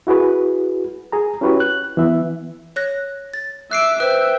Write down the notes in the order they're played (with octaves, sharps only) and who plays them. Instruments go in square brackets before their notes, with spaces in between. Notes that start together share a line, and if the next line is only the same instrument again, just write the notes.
[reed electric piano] E4 F#4 G#4 B4
G#4 A#5
C#4 E4 F#4 G4 B4 C#5
F#6
E3 B3 E5
[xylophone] C#5 F#6 A#6
A6
[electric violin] E5 D6 [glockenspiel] F#6 C7 D7
[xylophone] B4 C5 [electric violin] E5 G5 [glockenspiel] F#6